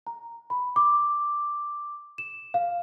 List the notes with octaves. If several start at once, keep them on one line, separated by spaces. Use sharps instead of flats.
A#5
B5
D6
E7
F5